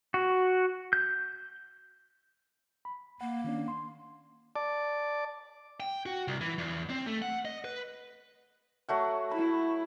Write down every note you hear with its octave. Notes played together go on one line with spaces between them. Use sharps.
F#4
G6
B5
A#3 F#5
D#3 C#4 D4
C6
D5 A5 D6
G5
F#4
C2
E3
E2
C4
A3
F#5
D#5
B4
F#3 A3 F#5
E4 B5